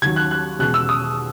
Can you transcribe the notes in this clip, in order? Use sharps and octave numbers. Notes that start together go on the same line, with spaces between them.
D#2 D#3 F#3 G#6
F#6
F#6
E2 B2 G#3 F#6
E6
D#6